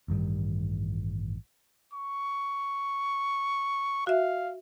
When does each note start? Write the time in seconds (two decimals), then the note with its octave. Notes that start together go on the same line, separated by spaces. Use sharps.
0.08 A1 G2 D#3 G3
1.93 C#6
4.07 F#4 E5 F5